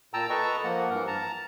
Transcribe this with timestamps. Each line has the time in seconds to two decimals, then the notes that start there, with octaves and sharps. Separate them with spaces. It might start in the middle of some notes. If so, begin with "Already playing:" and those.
0.14 A#2 G5 A5 A#5 E6
0.30 A4 B4 D#5 A5 A#5 C#6
0.64 F3 A#3 F#5
0.90 G2 E3 A#4
1.07 A5 A#5